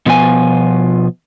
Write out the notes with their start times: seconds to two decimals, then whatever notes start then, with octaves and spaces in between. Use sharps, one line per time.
0.06 B2 F3 B3 F4 G#5